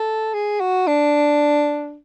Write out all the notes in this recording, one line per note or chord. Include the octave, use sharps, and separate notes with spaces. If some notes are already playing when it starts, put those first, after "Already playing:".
Already playing: A4
G#4
F#4
D4